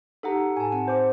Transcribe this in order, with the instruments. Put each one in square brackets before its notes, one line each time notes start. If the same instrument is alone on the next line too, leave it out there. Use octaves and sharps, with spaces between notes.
[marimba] D#4 G4 [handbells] A4 F#5 A#5
[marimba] A2 [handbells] G#5 A5
[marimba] C4 [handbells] F#5
[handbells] C5 D6